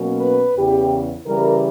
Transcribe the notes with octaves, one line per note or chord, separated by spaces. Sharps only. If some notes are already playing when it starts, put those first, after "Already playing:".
Already playing: B2 F#3 A#3 C#4
B4
E2 C#3 E3 G4
C#3 E3 G3 A#4